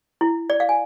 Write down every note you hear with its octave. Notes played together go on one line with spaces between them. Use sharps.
E4
D5
F5
G#5